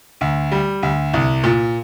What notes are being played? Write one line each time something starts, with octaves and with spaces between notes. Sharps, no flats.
D2
G3
D2
C2
A#2